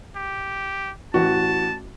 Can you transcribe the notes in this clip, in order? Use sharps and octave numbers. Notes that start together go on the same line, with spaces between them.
G4
A1 E3 F#4 A5